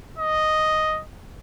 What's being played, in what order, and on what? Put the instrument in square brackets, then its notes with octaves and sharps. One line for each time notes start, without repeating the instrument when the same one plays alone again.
[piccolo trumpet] D#5